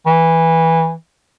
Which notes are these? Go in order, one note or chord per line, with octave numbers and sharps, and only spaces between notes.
E3